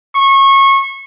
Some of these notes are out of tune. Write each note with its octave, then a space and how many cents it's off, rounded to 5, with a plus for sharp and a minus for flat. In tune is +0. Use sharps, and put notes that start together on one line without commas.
C#6 -25